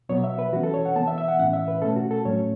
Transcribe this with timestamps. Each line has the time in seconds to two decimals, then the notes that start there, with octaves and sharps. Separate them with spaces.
0.09 B2 F#3 B3 C#5
0.24 E5
0.39 B4
0.52 E3 F#4
0.56 C#4
0.63 A4
0.74 C#5
0.85 F#5
0.96 B3 A5
0.99 E3
1.07 E5
1.18 E5
1.28 F#5
1.39 A2 E3 C#4 F#5
1.53 E5
1.68 B4
1.82 B2 A3 C#4 A4
1.96 F#4
2.11 A4
2.25 A2 F#3 A3 C#4 C#5